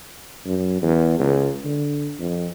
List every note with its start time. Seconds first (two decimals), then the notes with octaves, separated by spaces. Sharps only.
0.46 F#2
0.82 E2
1.19 C#2
1.65 D3
2.19 F2